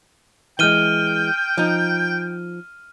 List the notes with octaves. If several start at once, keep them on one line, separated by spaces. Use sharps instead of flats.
E3 G#3 G5 F6 D#7 G7
F3 D#4